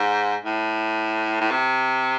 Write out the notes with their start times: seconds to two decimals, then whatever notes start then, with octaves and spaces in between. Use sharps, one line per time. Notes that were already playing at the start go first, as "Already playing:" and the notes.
Already playing: G#2
0.45 A2
1.41 A2
1.51 C3